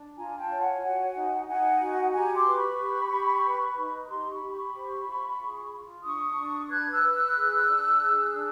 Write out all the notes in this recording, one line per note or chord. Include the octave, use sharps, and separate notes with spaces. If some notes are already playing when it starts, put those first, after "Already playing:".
Already playing: D4
F4 G#5 A#5
G5 A5
C#5
F#5 G#5
F#4 F#5 G#5
D#4
D#4 F#5 G#5
F#4
G4 G#5 A#5
C6 D6
B4
B5 C#6
G4
G4
B4
D#4
B5
G4 A#5 C6
B5 C#6
G4
B5 C#6
C5
F4
G#4
F4
D4 C#6 D#6
D4
B4 F#6 G#6
E6 F#6
B4
E6 F#6
G#4
D4
G#4
D4